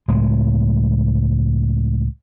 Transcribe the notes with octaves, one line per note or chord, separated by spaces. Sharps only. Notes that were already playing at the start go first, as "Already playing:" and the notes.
C#2 A2 G#3